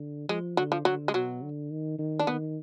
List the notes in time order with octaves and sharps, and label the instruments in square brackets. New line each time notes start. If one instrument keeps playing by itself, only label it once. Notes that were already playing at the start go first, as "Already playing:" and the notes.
Already playing: [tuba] D3
[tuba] F3 [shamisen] G#3
[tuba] D3 [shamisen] F#3
[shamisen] F3
[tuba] D3 [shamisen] F#3
[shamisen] G#3
[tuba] B2 [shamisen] F#3
[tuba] D3
D#3
D#3
[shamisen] D4
[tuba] D#3 [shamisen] B3